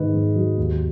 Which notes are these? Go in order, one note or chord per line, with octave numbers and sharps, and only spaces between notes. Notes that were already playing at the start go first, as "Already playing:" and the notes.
Already playing: G#2 D#3 B4 D#5
G#2
F#3
D#2